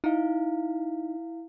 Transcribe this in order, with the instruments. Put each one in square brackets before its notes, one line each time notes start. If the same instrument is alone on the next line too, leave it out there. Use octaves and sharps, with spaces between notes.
[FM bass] D#4 [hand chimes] E4 F5